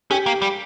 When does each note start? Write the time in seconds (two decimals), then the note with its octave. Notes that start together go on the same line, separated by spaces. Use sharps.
0.11 C#4 G4
0.26 A#3
0.42 G3